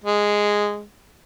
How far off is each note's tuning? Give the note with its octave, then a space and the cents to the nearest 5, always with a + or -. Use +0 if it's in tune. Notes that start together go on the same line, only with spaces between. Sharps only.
G#3 -5